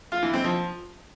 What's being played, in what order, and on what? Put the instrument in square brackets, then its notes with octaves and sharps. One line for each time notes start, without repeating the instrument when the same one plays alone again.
[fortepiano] F4
E3
C4
F3